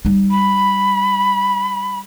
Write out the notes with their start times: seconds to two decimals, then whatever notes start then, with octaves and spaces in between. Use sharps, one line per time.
0.05 G3 D#4
0.31 B5